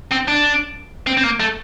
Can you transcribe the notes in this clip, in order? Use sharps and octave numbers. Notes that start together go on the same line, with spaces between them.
C4
D4
C4
C4
A#3
A3